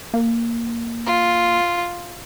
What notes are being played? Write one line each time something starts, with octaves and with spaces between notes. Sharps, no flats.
A#3
F4